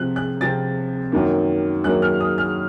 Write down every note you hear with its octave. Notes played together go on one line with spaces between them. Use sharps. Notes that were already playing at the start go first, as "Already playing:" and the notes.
Already playing: C3 F3 C4 F#6
F#6
C3 F3 C4 A6
F#2 D#3 F#3 A#3
F#2 D#3 F#3 A#3 F#6
F6
D#6
F6